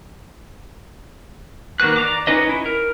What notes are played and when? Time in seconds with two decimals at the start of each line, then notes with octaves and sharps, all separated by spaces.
1.80 D#3 A#3 F#4 B4 F#6
1.96 D5 A#5 D6
2.27 C#4 D#4 B4 D#5
2.49 E4
2.66 A#4